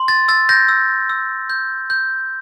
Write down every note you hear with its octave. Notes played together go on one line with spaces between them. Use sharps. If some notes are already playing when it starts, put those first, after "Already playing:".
Already playing: C6
A6
E6 A6
G6 A#6
E6
E6
G6
G6